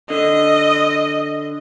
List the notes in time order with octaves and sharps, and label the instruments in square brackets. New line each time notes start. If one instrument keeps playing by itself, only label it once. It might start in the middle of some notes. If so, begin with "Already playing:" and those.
[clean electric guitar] D3 [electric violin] D#5